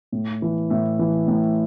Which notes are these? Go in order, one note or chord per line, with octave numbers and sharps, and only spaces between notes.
A2
E3
A2 E5
E3
A2